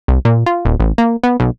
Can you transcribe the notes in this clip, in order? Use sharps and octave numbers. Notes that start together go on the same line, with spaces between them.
C2
A#2
F4
D#1
A1
A#3
B3
B1